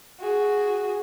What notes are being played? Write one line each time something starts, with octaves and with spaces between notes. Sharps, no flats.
F#4 G#4